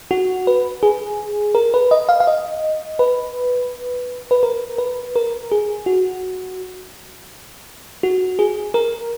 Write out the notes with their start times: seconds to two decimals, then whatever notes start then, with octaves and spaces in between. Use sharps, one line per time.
0.11 F#4
0.47 B4
0.83 G#4
1.55 A#4
1.74 B4
1.91 D#5
2.09 F5
2.20 F5
2.27 D#5
2.99 B4
4.31 B4
4.43 A#4
4.78 B4
5.16 A#4
5.52 G#4
5.86 F#4
8.03 F#4
8.39 G#4
8.74 A#4